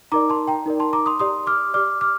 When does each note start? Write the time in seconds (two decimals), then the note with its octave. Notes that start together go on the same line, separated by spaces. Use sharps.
0.12 D#4 A#4 D5 A#5 D6
0.30 A5 C6
0.48 G5 A#5
0.66 D#4 A#4 D5
0.80 A5 C6
0.93 A#5 D6
1.06 C6 D#6
1.20 G4 D5 C6 D#6
1.47 D6 F6
1.74 G4 D5 D6 F6
2.01 D6 F6